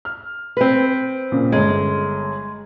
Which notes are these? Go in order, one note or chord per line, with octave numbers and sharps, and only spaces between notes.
F6
C4 B4
A#2 C#3
G1 G#3